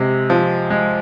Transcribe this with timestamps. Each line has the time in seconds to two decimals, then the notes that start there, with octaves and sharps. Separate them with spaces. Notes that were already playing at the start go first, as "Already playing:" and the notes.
Already playing: C3 G#3
0.30 F3
0.70 G#3